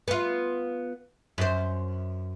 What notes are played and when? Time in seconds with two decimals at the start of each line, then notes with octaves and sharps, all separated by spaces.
0.08 B3 F4
1.38 F#2 C5